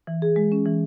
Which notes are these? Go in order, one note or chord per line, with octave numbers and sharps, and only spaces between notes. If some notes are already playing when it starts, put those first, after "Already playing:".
E3
G#4
G#3
C#4
E3